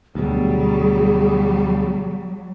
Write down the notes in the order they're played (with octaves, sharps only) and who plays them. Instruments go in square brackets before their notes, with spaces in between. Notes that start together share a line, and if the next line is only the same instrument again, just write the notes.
[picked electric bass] D2 B2 [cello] F#3 G3 [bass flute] G#4